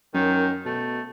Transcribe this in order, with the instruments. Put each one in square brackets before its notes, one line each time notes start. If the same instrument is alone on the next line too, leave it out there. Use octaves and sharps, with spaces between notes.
[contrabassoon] F#2 [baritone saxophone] D#3
[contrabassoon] B2 [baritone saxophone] A3